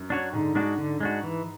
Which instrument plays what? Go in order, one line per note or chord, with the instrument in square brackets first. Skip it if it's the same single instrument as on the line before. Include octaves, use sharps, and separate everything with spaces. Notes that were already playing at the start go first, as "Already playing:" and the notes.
Already playing: [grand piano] F#2
[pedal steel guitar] D4 F#4 C#5
[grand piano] G#2 [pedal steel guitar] D3
[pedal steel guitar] G#3 D4 F#4
D3
G#3 D4 F#4
E3